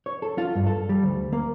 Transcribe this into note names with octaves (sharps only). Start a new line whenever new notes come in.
C#5
A4
F4
G2
A4
G3
D2
A#3